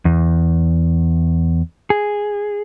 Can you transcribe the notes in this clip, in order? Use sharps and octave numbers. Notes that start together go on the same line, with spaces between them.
E2
G#4